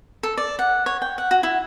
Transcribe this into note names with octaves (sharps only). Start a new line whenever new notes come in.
A4
D5
F#5
C#5
G5
F#5
F#4
E4